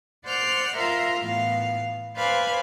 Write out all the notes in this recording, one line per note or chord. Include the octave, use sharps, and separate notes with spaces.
C5 D5 F#5 F6 G6
F4 A#4 E5 F5 A#5 C6
A2 E3 B3 F5
B4 C5 D5 F5 G#5 B5